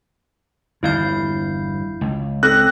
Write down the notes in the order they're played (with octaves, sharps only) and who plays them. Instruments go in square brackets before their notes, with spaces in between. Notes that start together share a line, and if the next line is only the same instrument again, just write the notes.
[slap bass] G1 E2 [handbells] E4 F5 G6
[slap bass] C#2
[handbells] C4 A4 A#6 [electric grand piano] F#6